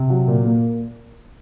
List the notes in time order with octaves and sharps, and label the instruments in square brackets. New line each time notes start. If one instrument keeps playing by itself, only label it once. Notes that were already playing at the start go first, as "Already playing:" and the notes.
Already playing: [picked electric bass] C3
[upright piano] F#3
A#2
A#3